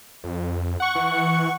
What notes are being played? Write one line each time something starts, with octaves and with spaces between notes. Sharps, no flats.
F2
F#5 C#6
E3